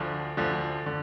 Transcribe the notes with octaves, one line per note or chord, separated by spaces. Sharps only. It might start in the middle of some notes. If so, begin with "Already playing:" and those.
Already playing: D2 D3 F3
D2 D3 F3
D3